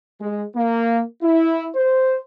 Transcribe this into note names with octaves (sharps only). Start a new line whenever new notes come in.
G#3
A#3
E4
C5